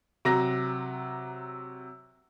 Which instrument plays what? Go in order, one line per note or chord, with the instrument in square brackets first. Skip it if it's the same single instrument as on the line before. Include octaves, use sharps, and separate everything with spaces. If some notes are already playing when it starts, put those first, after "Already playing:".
[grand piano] C3 F#3 A#5 A#6